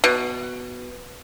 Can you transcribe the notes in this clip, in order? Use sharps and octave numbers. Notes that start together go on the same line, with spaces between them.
B2